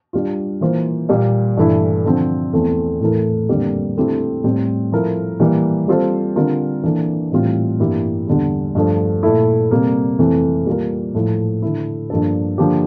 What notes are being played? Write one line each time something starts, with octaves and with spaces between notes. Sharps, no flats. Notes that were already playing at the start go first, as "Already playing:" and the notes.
G3 D4 F4
E3 A#3 F4 C5
A#2 G3 A#3
G2 E3 A3 E4
D3 F3 C4
E2 E3 A3 C4
A2 E3 A3 E4 A#4
F2 D3 G3 A#3
D3 A3 C4 E4 G4
A2 G3 C4
F3 A3 E4 A#4
E3 G3 A#3
G3 C4 F4 A4 C5
D3 G3 C4 F4 A#4
E3 A#3 D4 A4
A2 E3 G3 C4 F4
G2 E3 A#3 E4 G4
E2 D3 G3
G2 F3 A3
A#2 A3 E4
C3 G3 A#3
F2 C3 E3 A3
G3 A#3 F4 A#4
A2 F3 A3 E4
D3 A3 E4
G2 F3 A#3 D4 A4
D3 F3 A#3 D4 G4